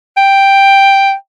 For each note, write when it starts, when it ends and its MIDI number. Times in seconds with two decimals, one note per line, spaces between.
0.17 1.13 79